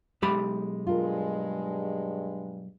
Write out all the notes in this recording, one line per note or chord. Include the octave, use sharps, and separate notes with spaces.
B1 G#3 G4 B5
G2 G#3 F4 A#4